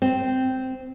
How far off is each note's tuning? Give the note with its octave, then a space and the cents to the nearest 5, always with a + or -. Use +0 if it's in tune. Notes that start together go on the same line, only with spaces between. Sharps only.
C4 -10